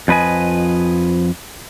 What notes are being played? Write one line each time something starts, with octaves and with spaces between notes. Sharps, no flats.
F2 F3 B4 D#5 G#5